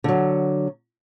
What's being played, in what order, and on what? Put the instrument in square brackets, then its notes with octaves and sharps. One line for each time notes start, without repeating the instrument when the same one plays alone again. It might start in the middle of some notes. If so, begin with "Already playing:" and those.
[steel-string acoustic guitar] D3 F#3